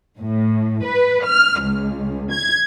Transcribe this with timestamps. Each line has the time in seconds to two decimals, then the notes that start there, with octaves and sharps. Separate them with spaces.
0.19 A2
0.85 B4
1.26 F6
1.62 C#2
2.32 G#6